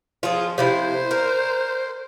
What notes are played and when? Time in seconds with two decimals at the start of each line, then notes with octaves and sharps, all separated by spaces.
0.23 F3 F4 G#4
0.58 C3 F3 E4 C5
1.11 A#4